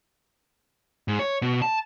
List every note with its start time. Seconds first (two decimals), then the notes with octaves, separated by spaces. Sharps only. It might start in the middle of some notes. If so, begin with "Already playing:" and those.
1.08 G#2
1.19 C#5
1.42 B2
1.62 A5